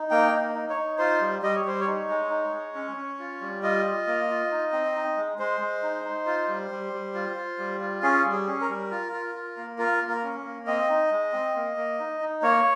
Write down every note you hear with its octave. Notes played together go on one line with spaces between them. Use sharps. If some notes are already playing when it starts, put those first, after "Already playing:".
Already playing: D#4
A#3 G5
D#4
D#4
C#5
D#4
F4 C5
G3
G3 D#5
C#5
G3 C5
C#5
D#4
G#3
D#4
G#3
C#4
C#4
F4
G3
F4 D#5
F4
A#3
F4
D#4
C4
D#4
G#3
G#3 C5
G#3
D#4
D#4
F4
G3
G3
G3
F4
F4
G3
F4
C#4 G#4
G3
G#4
C#4
A#4
G3
F4
F4
F4
A#3
F4 A#4
A#3
A#4
C#4
A#3
C4 D#5
D#4
G#3
C4
A#3
A#3
D#4
D#4
A#3 C#5